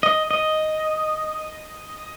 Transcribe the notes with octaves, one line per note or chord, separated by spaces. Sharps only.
D#5
D#5